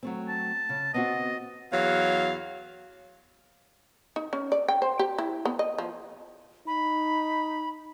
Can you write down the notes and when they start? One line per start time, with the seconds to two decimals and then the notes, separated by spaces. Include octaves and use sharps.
0.03 F#3 A3 C4
0.28 A5
0.69 C#3
0.94 B3 C4 F#4 D#5
1.71 E2 F#3 F5
4.16 D#4
4.33 C#4
4.52 D5
4.68 G5
4.82 C5
4.99 G4
5.18 E4
5.45 B3
5.59 D#5
5.78 F3
6.67 D#4 B5